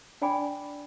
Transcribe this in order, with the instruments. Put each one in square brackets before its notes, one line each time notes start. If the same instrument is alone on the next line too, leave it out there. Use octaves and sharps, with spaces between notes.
[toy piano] D4 D5 G5 G#5 B5 D6